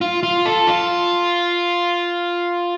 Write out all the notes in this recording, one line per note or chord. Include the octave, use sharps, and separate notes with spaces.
F4
F4
A4
F4